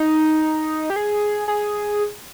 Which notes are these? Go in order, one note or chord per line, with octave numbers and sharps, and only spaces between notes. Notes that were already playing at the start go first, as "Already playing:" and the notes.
Already playing: D#4
G4
G#4
G#4